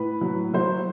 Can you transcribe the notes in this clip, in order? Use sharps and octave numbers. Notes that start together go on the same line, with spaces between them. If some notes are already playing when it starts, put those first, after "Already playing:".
Already playing: A2 B4
F#3
F#3 C5